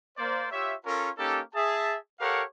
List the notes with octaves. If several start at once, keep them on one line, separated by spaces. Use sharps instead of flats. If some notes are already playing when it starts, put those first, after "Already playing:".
A#3 C5 D5
F4 G4 C#5 E5
C#4 F4 A4 A#4
A#3 C#4 D#4 G4 A4
G#4 E5 A5
G4 A4 A#4 C#5 F5 F#5